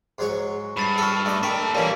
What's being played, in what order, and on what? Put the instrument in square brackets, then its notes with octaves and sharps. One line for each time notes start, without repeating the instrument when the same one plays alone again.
[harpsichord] G#2 F#3 F#4
[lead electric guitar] G2 [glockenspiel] B5 A6 C7
[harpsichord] F#4 A4 [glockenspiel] E6 F6
[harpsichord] A3 D6 [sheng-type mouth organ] D4 D#5
[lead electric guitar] A#3 G5 [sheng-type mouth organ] A4 [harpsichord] A#4 [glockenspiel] B6
[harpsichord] A#2 E3 [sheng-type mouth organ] A#3 C#4 D6 [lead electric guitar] G4 D5 [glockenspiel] B6